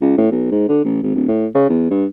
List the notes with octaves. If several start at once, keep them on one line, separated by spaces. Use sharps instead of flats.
C#2
A2
B1
G#2
D3
A1
G#1
D1
A2
C#3
E2
G2